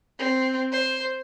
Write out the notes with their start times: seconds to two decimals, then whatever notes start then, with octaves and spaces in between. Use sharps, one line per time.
0.19 C4
0.72 C5